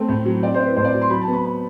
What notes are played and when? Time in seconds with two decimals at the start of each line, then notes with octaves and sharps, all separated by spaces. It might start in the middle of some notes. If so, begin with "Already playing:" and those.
Already playing: A3 C4
0.09 A2
0.26 F#3
0.43 C4 D5
0.54 C5
0.60 E4
0.66 B4
0.77 A2 C5
0.84 D5
0.94 F#3
1.02 C6
1.10 F#3 B5
1.21 A5
1.28 B3
1.33 B5
1.45 B5